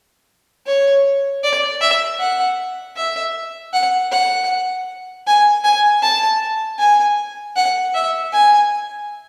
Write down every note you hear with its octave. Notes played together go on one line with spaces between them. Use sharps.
C#5
D5
E5
F#5
E5
F#5
F#5
G#5
G#5
A5
G#5
F#5
E5
G#5